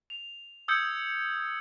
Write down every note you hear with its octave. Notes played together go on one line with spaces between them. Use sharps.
F7
D#6 E6 G6 G#6 C#7